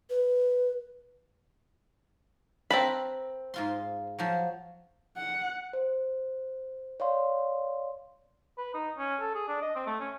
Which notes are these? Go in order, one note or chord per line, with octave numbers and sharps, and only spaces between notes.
B4
C4 A#4 B4 A5 B5
G#2 F4 C6
F3 F#3
F#5
C5
C#5 D5 F5 C6
B4
D#4
C#4
A4
G#4
D4
D#5
C4
A3
C#4